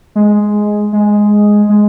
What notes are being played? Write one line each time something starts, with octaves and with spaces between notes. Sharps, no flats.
G#3
G#3
G#3